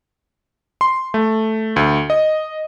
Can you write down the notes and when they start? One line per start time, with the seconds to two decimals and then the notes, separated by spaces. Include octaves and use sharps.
0.81 C6
1.14 A3
1.76 D2
2.10 D#5